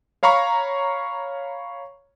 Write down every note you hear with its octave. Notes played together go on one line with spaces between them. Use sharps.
C#5 F5 A#5 B5 C#6